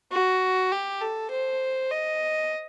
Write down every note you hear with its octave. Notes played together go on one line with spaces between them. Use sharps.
F#4
G4
A4
C5
D#5